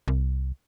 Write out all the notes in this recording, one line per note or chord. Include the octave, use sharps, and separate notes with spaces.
C2